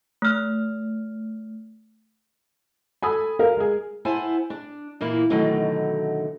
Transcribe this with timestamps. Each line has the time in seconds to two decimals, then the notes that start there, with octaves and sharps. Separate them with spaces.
0.22 A3 F6
3.02 A4 G#5 B5 D#6
3.39 A#4 F5
3.57 G#3 G#4
4.05 B3 E4 C5 G#5 A5
4.50 D4
5.01 A#2 E3 A#3 E4
5.30 B2 D3 D#3 F#3 A3 D#4